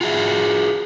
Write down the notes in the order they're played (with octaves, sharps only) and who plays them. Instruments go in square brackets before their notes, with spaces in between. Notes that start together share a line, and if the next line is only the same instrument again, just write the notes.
[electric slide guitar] F4 F#4 G#4 E5